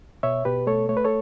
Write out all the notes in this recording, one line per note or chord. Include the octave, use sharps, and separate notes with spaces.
B2 C#5 E5
B2 G4 B4
A3 A4 C#5
A3 C#5
B4
A4 C#5